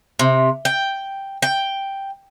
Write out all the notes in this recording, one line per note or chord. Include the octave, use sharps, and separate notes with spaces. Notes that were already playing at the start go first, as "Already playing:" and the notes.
C3
G5
G5